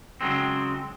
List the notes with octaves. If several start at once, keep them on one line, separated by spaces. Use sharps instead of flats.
C#3 F#3 G#3 C4